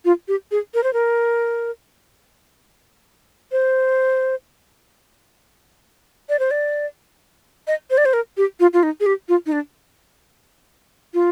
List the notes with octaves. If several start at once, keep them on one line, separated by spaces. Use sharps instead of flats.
F4
G4
G#4
A#4
C5
A#4
C5
D5
C5
D5
D#5
C5
D5
C5
A#4
G4
F4
F4
D#4
G#4
G4
F4
D#4
D4
F4